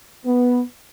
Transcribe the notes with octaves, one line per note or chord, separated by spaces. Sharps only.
B3